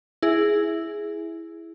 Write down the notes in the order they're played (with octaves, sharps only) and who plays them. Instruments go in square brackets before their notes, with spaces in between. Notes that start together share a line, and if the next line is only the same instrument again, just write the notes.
[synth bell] E4 G#4